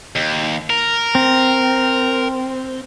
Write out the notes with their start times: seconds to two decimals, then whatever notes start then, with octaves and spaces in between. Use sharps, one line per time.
0.16 D#2
0.70 A#4
1.15 C4